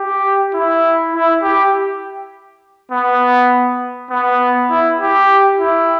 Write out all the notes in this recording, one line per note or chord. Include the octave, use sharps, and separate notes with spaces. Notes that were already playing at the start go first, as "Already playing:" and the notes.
Already playing: G4
E4
E4
G4
B3
B3
E4
G4
E4